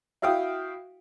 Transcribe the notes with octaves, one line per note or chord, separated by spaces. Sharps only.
E4 F#4 F5 G5 D#6